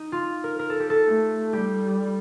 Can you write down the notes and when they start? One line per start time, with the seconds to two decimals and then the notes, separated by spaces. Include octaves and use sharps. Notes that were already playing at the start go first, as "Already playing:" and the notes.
Already playing: D#4
0.12 F4
0.44 A#4
0.59 A#4
0.70 A4
0.80 G4
0.90 A4
1.06 A3
1.53 G3 G4